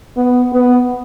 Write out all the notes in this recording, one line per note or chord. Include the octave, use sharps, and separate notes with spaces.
B3
B3